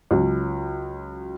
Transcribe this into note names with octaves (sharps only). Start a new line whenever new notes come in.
C#2 F#3